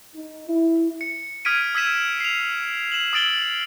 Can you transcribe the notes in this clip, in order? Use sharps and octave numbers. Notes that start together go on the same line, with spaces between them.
D#4
E4
C#7
D#6 F6 G#6 B6 D7 D#7
D#6 E6 G#6 B6 D#7 E7
C7 F7
E7 F#7
D#6 E6 A6 D7 F#7 G7